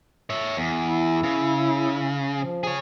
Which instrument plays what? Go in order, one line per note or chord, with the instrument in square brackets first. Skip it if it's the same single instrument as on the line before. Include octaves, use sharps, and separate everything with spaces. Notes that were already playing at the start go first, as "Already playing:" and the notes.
[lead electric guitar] C#5 E5
E2
[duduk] E4
[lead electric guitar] C#3
[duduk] F3
[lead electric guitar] G#4 C#5